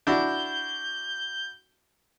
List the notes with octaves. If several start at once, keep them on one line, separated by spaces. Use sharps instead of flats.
D4 E4 F#4 G6